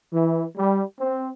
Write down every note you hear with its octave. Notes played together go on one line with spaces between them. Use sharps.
E3
G3
C4